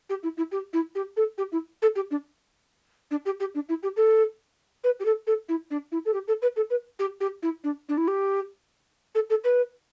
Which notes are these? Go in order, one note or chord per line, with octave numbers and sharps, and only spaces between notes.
G4
E4
E4
G4
E4
G4
A4
G4
E4
A4
G4
D4
D4
G4
G4
D4
E4
G4
A4
B4
G4
A4
A4
E4
D4
E4
A4
G4
A4
B4
A4
B4
G4
G4
E4
D4
D4
E4
G4
A4
A4
B4